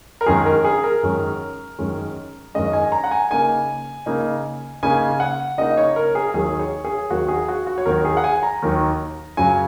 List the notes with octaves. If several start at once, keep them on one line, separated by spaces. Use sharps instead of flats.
A#4
F#2 D#3 G#3 C#4 G#4
A#4
G#4
A#4
F#2 D#3 G#3 C#4
F#2 D#3 G#3 C#4
F#2 D#3 G#3 C#4 D#5
G#5
A#5
F#5
G#5
C#3 A#3 D#4 G#5
C#3 A#3 D#4
C#3 A#3 D#4 G#5
F#5
C#3 A#3 D#4 D#5
C#5
A#4
G#4
D#2 D#3 F#3 G#4
C#5
G#4
D#2 D#3 F#3 F#4
G#4
F#4
F#4
C#5
D#2 D#3 F#3 A#4
G#4
F#5
G#5
A#5
D#2 D#3 F#3
F#2 C#3 F#3 G#5